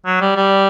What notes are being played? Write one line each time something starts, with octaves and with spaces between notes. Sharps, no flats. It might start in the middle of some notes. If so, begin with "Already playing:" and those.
F#3
G3
G3